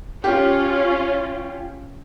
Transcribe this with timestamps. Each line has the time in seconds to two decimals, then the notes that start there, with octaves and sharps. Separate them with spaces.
0.24 C#4 F4 G4